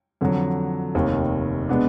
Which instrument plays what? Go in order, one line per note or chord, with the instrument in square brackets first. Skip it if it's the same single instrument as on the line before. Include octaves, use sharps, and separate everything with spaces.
[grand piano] F2 D3 F#3
F1 D#2 D#3
B2 G#3 B3 D4